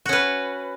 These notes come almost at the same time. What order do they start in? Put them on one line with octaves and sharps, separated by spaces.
F#4 C#4 B4